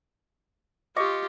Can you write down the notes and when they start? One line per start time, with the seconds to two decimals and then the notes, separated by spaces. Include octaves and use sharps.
0.96 F4 G4 D#5 C#6 D6